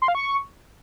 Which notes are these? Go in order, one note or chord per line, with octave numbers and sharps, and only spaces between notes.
C6
F5
C#6